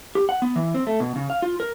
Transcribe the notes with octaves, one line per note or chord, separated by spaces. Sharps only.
G4
F#5
B3
E3
C4
A3
B2
C#3
F5
F4
A#4